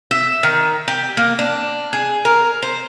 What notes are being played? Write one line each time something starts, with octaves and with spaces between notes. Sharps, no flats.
E5
D#3
G4
A#3
D4
G#4
A#4
C5